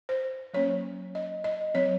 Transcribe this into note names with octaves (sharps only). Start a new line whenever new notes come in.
C5
F#3 A#3 C#4 C#5
D#5
D#5
F#3 C4 C#5